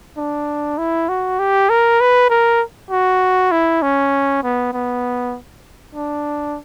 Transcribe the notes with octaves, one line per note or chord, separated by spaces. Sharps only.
D4
E4
F#4
G4
A#4
B4
A#4
F#4
E4
C#4
B3
B3
D4